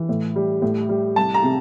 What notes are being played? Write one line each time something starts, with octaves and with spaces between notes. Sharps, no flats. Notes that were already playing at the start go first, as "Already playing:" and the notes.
Already playing: E3
A2
G3
A2
G3
C2 A5
A#5
C3